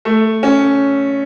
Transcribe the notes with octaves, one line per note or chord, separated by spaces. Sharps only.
A3
C#4